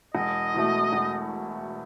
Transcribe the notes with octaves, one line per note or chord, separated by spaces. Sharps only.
E1 D#5
E2 B2 A3
E1